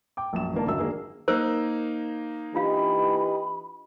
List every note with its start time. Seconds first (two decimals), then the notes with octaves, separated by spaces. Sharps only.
0.17 G5 D6
0.33 A#1 F#2 E7
0.54 A1 G#2 D3 A#3 D5 A5
0.66 G#1 C#2 F#2 F#3 E6
0.79 D#3 A#3 D4 G#4
1.28 A#3 D#4 A#4 C5 E6
2.55 E3 D4 F4 G4 D#5 F5 B5